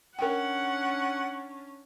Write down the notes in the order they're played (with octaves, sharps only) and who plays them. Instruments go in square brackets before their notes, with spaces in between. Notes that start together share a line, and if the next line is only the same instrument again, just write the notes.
[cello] C#4 D4 [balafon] A#4 G5 [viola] F#5